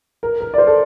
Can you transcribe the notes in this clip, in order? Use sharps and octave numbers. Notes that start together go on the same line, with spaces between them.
A#4
A#4
D5
C5
A4